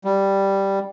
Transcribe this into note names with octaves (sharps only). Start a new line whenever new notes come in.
G3